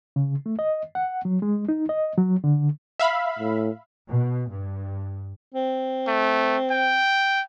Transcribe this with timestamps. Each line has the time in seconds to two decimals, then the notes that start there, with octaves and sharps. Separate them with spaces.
0.16 C#3
0.46 A3
0.59 D#5
0.95 F#5
1.25 F#3
1.42 G#3
1.69 D#4
1.89 D#5
2.18 F#3
2.44 D3
2.99 E5 F5 B5
3.39 A2
4.09 B2
4.49 G2
5.54 C4
6.07 A3
6.71 G5